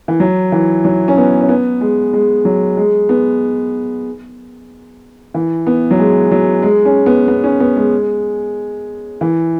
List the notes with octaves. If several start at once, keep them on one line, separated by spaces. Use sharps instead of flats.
E3
F#3
E3
F#3
C#4
B3
C#4
B3
G#3
G#3
F#3
G#3
B3
E3
B3
F#3
G#3
F#3
G#3
C#4
B3
B3
C#4
B3
G#3
E3